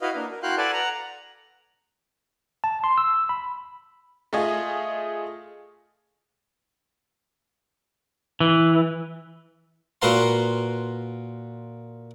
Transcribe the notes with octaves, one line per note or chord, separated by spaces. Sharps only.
E4 F#4 B4 D#5 F5
A#3 D4
A#4
E4 F#4 F5 G5 C6 F#6
A4 B4 D5 F#5 G#5 A5
F#5 A#5
A5
C6
E6
B5
A3 F4 G#4 D#5
E3
A#2 F#4 B4 F5 A#5 C6